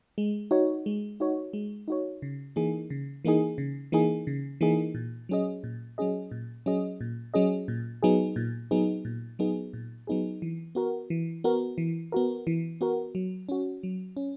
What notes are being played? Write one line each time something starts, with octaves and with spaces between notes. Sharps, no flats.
G#3
D#4 F#4 C#5
G#3
D#4 F#4 C#5
G#3
D#4 F#4 C#5
C#3
E3 A#3 D#4 G#4
C#3
E3 A#3 D#4 G#4
C#3
E3 A#3 D#4 G#4
C#3
E3 A#3 D#4 G#4
A#2
F#3 C#4 G#4 D#5
A#2
F#3 C#4 G#4 D#5
A#2
F#3 C#4 G#4 D#5
A#2
F#3 C#4 G#4 D#5
A#2
F#3 B3 D#4 G#4
A#2
F#3 B3 D#4 G#4
A#2
F#3 B3 D#4 G#4
A#2
F#3 B3 D#4 G#4
E3
B3 F#4 A#4
E3
B3 F#4 A#4
E3
B3 F#4 A#4
E3
B3 F#4 A#4
F#3
C#4 F#4
F#3
C#4